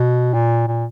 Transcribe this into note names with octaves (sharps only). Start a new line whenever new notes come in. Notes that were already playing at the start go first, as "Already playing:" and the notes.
Already playing: B2
A#2
A#2